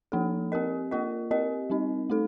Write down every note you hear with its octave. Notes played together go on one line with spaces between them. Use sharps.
F3 A#3 D#4 A4
C4 G4 A#4 D#5
A#3 F4 A#4 D#5
C4 G4 A#4 D#5
G3 C4 D#4
A3 D#4 A4